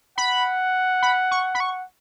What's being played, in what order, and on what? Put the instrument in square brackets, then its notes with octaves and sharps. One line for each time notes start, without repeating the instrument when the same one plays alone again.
[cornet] F#5 [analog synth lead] B5
[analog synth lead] B5
C#6
B5
C#6